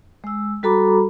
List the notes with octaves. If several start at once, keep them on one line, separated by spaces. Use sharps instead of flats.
G#3 E6
G3 F#4 A4 A#5 B5 D6